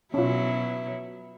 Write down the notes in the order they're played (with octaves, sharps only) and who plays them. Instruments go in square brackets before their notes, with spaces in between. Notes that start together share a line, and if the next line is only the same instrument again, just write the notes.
[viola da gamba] B2 F#3 E4 [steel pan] C#4 F4